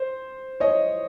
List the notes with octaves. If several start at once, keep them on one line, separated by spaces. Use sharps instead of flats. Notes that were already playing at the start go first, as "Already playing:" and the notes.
Already playing: C5
C#5 D#5